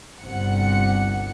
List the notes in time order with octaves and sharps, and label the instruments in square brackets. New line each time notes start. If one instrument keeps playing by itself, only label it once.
[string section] G1 C2 C3 F#5 C#7